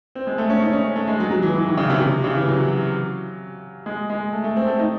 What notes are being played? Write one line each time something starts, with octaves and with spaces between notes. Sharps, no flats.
C4
G#3
A3
C#4
D#4
C#4
A3
G#3
F#3
F#3
E3
E3
D#3
C#3
C3
C3
C#3
E3
F#3
G#3
G#3
A3
A3
C4
A3
D#4